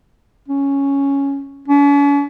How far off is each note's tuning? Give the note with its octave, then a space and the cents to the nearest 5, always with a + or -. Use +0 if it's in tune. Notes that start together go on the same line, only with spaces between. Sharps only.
C#4 +0
C#4 +45